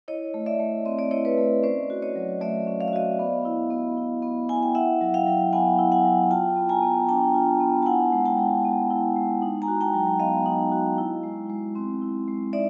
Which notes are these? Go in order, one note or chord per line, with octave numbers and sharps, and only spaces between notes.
E4 C#5 D#5
A3
D5 E5
A3
C4 D#5
D5
E4 C#5 D#5
B4 C#5
A3
C#4 C5 D5
F#4
C#5 D#5
F#3
A3 D5 E5
C#4
F5
E5
F#4 D#5 F5
B3
E4
B3
E4
B3
E4 G#5
G5
E4 E5 F#5
F#3
F5 G5
F#3
B3 F#5 G#5
E4
F#5 G#5
F#3
F4 G5 A5
B3
G#5 A#5
B3
D4 G5 A5
F4
B3
A5
E4 F#5 G#5
G#3
G5 A5
G#3
B3
E4
G#3
D#4
G#5 A#5
F#4
G5 A5
F#3
B3 D#5 F5
D#4
F#4
E4
G#3
G#3
C4
E4
G#3
D#4 D5 E5